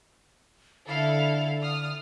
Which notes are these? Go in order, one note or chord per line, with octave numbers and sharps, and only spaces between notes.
D3 E4 A4 F5
D#6 F6